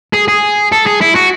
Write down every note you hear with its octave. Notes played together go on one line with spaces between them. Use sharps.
G#4
G#4
A4
G#4
E4
F#4